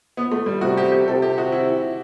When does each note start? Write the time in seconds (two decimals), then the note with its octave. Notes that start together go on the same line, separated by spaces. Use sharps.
0.17 B3
0.32 A3
0.46 G3
0.61 C3 F#4
0.77 G4
0.92 G4
1.07 C3 A4
1.22 G4
1.38 F#4
1.52 E4